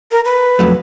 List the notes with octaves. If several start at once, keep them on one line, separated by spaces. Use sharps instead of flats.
A#4
B4
F2 F#3 A3